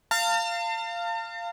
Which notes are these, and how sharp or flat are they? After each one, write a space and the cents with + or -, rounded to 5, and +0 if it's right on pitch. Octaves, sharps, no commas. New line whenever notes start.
F5 -10 A5 +45